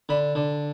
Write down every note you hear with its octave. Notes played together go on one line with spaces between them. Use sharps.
D3 B5
D3